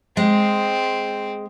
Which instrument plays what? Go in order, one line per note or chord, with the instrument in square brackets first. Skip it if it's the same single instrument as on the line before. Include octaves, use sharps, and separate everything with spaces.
[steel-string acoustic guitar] G#3 [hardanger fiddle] C4